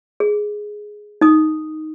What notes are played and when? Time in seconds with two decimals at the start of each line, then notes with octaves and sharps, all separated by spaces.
0.20 G#4
1.21 D#4 D#6